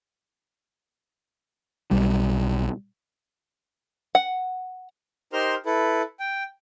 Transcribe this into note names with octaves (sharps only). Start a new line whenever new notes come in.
B1 G3
F#5
D#4 G4 A#4 C5 C6 F6
E4 A4 B4
G5